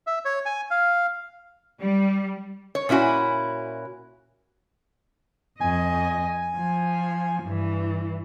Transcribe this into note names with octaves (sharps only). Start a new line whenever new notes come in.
E5
C#5
G#5
F5
G3
C#5
A#2 C#4 E4 F#4 G#5
F2 D#5 G#5
F3
G2 E3